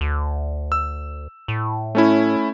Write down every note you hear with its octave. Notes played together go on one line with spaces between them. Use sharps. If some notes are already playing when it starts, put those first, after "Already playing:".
D2
E6
A2
A3 C#4 E4